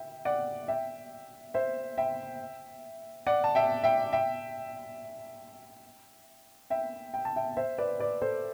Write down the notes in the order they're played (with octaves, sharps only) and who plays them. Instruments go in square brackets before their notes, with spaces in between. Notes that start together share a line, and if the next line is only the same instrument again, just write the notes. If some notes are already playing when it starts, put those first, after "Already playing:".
Already playing: [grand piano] E5 G5
D5 F#5
E5 G5
C5 E5
E5 G5
D5 F#5
A5
E5 G5
E5 G5
E5 G5
E5 G5
G5
A5
E5 G5
C5 E5
B4 D5
B4 D5
A4 C5